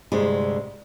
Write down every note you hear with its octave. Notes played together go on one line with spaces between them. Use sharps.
D2 G2 C3 G#3